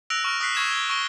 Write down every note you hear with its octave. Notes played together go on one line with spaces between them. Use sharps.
E6 F#6 A#6 D7 F7
C#6 F6 D7
D#6 F#6 B6 C7
C#6 G#6 E7
G7
C#6 A#6 D7 G7